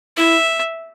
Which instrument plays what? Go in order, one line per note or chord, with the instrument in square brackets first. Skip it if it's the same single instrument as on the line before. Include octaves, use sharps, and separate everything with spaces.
[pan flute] E4 [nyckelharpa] E5